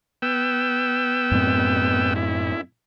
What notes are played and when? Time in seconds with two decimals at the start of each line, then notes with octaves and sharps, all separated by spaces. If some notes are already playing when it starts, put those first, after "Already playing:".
0.22 B3 G5 E6
1.32 F#2 A2 C4
2.16 E4